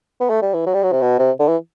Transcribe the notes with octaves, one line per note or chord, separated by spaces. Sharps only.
B3
A3
G3
E3
F#3
G3
F#3
C3
B2
C3
D3
E3